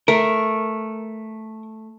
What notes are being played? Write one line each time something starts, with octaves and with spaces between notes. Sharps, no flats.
A3 A#4